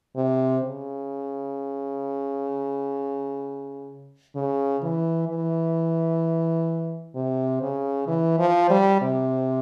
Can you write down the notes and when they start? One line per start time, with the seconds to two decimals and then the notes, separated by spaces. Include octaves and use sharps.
0.16 C3
0.63 C#3
4.35 C#3
4.82 E3
5.28 E3
7.15 C3
7.62 C#3
8.07 E3
8.39 F3
8.70 G3
9.02 C3